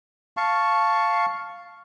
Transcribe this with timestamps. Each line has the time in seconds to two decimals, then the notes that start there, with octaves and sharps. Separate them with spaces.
0.37 F5 A5 C#6